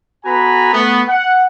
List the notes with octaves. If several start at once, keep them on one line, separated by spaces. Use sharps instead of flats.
B3 F#4 A4 G#5 A#5 B5
A3 B3
F#5